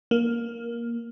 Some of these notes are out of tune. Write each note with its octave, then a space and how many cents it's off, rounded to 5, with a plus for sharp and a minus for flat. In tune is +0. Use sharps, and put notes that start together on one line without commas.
A#3 +10